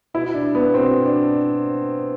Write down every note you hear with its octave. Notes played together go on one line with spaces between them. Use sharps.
B2 E4
D4
B3
B2 C4
D4